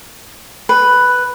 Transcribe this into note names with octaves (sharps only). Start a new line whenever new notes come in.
B4